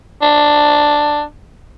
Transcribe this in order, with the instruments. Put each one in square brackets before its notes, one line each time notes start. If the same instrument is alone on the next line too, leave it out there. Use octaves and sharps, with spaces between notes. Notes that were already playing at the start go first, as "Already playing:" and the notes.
[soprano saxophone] D4